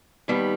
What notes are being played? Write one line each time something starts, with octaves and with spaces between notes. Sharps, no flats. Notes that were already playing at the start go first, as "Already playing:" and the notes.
D#2 D#3 G3 B3